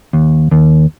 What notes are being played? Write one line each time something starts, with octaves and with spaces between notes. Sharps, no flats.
D#2
D#2